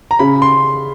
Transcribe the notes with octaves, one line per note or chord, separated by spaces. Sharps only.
A#5
C#3 B5
C6